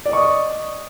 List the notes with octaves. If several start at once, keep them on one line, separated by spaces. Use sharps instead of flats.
D5 D#5 C#6 D#6